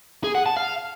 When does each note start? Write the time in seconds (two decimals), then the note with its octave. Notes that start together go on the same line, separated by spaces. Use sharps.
0.24 G#4
0.35 F#5
0.46 A5
0.57 F5